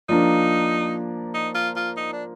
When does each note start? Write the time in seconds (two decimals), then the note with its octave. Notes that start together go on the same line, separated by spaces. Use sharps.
0.09 F3 A#3 D4 D#4
1.34 D#4
1.55 F4
1.76 F4
1.97 D#4
2.13 D4